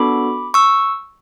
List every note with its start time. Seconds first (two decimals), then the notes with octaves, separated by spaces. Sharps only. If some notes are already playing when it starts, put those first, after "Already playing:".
Already playing: B3 D4 F#4 A4 B5 D6
0.54 C#6 E6